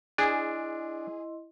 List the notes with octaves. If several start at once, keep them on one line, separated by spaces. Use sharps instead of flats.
D4 E4 G#4 D#5 C6